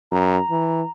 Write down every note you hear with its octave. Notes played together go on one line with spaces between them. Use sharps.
F#2 A#5
E3